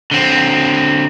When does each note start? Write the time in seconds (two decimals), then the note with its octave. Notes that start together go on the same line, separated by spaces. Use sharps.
0.11 D3 C4